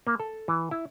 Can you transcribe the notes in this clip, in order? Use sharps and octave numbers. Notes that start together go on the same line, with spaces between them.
A#3
A4
E3
E4